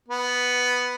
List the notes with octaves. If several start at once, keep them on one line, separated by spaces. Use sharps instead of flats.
B3